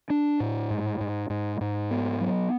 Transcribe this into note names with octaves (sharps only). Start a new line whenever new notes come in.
D4
A2
G#2
G#2
G#2
G#2
B3
F#3